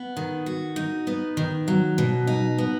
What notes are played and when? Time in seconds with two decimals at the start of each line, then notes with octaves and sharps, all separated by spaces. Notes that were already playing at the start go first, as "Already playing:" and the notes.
Already playing: B3
0.17 D#3
0.46 F#4
0.76 D#4
1.07 B3
1.37 D#3
1.68 F#3
1.98 B2
2.27 D#4
2.58 B3